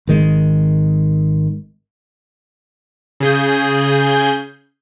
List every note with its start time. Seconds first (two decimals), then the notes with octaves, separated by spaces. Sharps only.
0.07 G#1 D#3 G#3
3.20 C#3 G#4 G6